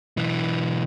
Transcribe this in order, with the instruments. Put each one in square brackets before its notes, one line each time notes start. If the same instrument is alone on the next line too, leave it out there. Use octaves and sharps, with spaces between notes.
[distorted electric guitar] B1 E3